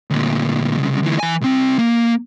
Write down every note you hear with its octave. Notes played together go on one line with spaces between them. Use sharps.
D2 A#2
C2 C#3
D2 E3
E3 G#5
C2 C4
A#3